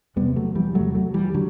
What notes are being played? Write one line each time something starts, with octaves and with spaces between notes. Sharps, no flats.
E2 C3 G3 B3
F#3 A3
E3 G3
E2 C3 F#3 A3
F#3 A3
E3 G3
D3 F#3